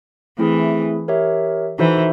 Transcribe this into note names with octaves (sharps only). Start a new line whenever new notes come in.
E3 A3 C4 E4 G#4
G4 A#4 C#5 E5
E3 D#4 F#4 A4 C5 E5